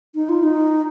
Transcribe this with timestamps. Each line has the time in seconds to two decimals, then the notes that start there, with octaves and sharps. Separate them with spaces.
0.15 D#4
0.29 F4
0.43 D#4